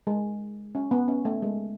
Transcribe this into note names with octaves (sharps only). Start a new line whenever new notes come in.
G#3
C#4
B3
C#4
A3
G#3